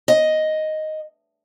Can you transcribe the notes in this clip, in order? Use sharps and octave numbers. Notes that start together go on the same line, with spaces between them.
D#5